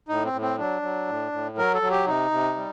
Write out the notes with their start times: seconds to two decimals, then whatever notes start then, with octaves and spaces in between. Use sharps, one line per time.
0.09 A2 D#4
0.25 C4
0.33 A2
0.41 C4
0.58 F#3 D4
0.82 F#3
1.07 A2
1.32 A2
1.58 F#3 A#4
1.74 A4
1.82 F#3
1.91 G4
2.06 C3 D#4
2.31 C3
2.56 G3